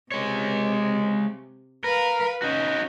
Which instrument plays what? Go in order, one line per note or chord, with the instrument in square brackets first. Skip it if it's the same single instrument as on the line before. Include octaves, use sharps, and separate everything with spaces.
[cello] C3 [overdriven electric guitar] G#3 C#5
[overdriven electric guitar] A#4 [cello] B4 F5
[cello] C#4 [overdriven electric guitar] D#4 F#4